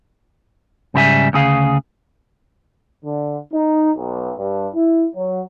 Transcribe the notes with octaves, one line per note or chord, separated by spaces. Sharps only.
G#2 C#3 G3 E4 E5 G#5
D2 C#3 G#4 F5
D3
D#4
B1
G2
E4
F#3